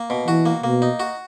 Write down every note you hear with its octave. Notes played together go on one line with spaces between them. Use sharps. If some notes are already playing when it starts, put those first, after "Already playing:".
Already playing: A#3
B2
E3 F#4
A#3
B2 A#3
D#4
F#4